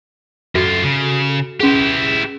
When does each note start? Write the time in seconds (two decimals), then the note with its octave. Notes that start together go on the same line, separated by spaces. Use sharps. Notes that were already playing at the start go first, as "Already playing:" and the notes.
0.55 F#2 F4 F#4 A4
0.84 C#3
1.60 C#4 E4 G4 G#4